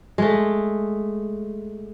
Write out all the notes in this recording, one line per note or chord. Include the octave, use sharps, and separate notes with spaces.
G#3 A3